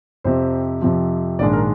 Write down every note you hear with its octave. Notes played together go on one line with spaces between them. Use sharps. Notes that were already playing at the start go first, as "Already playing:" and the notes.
F2 C3 F3 C5
F2 C3 F3
A#1 G#2 D#3 G#3 D4 D5
A#4